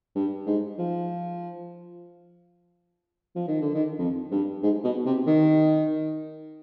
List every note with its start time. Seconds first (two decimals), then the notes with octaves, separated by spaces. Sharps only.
0.16 G2
0.47 G#2
0.78 F3
3.36 F3
3.48 D#3
3.62 D3
3.75 D#3
3.99 F2
4.31 G2
4.63 G#2
4.84 B2
5.06 C3
5.27 D#3